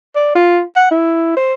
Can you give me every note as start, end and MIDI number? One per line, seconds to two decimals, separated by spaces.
0.15 0.35 74
0.35 0.61 65
0.76 0.90 78
0.91 1.34 64
1.36 1.54 72